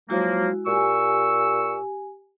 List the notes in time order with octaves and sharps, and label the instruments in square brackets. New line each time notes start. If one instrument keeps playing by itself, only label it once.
[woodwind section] F3 F#3 A#3 [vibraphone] G#3 E4 F#4
[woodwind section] A#2 C#6 E6 [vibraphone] G4 G#5